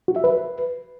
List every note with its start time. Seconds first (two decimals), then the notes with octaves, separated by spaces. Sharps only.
0.08 F#4
0.16 E5
0.24 B4